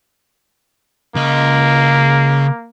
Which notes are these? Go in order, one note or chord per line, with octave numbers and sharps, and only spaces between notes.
C#3 A#3 D#5